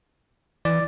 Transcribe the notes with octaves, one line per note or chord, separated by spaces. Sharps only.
E3 D5